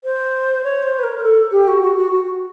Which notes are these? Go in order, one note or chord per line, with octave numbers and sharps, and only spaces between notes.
C5
C#5
C5
B4
A#4
A#4
A4
G4
F#4
F#4
F#4
F#4